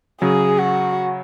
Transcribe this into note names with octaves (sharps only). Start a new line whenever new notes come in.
C#3 F#3 G#4
F#4